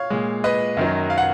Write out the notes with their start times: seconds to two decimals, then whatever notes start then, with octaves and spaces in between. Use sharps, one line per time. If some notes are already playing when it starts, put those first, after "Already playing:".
Already playing: C#5 F5
0.10 A#2 G#3
0.44 B4 D#5
0.77 F#2 D#3 F#3
1.10 F5
1.18 F#5